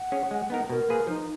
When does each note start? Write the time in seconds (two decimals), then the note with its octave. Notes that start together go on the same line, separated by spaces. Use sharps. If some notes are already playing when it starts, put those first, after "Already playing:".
Already playing: F#5
0.12 C#4 G#4 C#5
0.31 G#3
0.50 B3 D#4 A#4
0.70 B2 A#4
0.89 A#3 F4 G#4 B4
1.07 F3 D#4